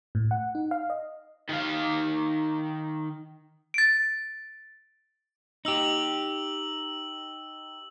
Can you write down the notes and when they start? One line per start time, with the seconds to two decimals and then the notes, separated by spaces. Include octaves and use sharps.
0.15 A2
0.31 F#5
0.55 D#4
0.71 F5
0.90 D#5
1.49 D#3 F5
3.74 A6 D7
5.65 D#4 G4 E6 F#7